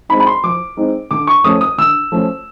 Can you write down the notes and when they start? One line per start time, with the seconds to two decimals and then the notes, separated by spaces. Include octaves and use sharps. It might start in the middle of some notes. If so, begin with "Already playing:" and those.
0.09 G#3 C4 D#4 B5
0.20 B5
0.27 C6
0.44 F3 D6
0.77 G#3 C4 D#4
1.11 D3 D6
1.27 C#6
1.44 F3 A3 C#4 D#6
1.61 D#6
1.78 D3 E6
2.12 F3 A3 C#4